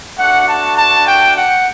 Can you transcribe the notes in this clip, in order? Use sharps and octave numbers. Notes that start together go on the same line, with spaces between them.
A3 D4 F#4 F#5
A5
A5
G5
F#5